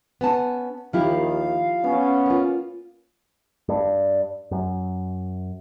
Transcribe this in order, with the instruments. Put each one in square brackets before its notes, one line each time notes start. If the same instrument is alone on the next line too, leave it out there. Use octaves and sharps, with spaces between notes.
[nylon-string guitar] B3 C#4 A5
[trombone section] D#2 D#3 [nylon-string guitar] F3 E4 G4 [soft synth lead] F5
[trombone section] B3 C#4
[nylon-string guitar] A#3 F4
[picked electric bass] G2
F#2